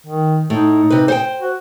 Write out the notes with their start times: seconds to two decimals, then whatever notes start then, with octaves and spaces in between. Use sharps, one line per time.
0.06 D#3
0.50 A2 D#4
0.90 C3 B4
1.08 C5 F#5 G5
1.41 F#4